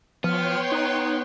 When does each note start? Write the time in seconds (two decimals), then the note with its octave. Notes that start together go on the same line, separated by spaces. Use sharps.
0.24 F3 B3 C#5 G5 C6 F6
0.72 D#4 F#6